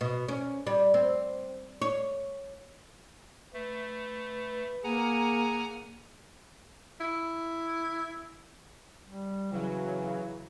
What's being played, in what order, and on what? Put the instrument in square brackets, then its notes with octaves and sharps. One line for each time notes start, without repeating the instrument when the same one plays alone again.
[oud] B2
C#4
G3
C4
C#5
[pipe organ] A3 [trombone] B4
[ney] A#3 [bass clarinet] G#4 [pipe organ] F#5 G#5 A#5
[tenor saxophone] E4
[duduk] G3
[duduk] C#3 [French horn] E3 [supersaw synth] F#3